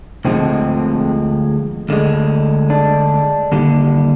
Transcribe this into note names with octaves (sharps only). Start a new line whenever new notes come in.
D2 D3 F3 G#3 C4
D2 D3 G#3
D4
D#2 D3 G3